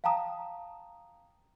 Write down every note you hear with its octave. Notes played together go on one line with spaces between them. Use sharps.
F5 G5 A5 A#5 D#6